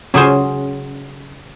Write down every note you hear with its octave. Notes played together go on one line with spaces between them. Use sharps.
C#3 F#3 C#4 G#4 C5